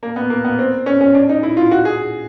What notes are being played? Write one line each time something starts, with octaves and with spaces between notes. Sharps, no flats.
A#3
B3
A#3
B3
C4
C#4
C#4
D4
D#4
E4
F4
F#4
G#4